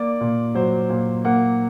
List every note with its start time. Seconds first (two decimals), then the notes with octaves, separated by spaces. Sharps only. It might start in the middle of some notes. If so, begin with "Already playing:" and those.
Already playing: A#3 D5
0.21 A#2
0.55 F#3 C5
0.89 A#2
1.25 A#3 F#5